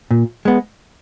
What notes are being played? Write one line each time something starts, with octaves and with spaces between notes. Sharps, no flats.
A#2
G#3 B3